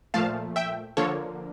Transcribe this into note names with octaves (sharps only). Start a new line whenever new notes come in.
A#2 F3 A3 F5 A5
E5 G5
D3 F3 A#3 A4 C#5